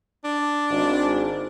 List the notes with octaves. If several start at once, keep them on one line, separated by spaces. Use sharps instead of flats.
D4
G#1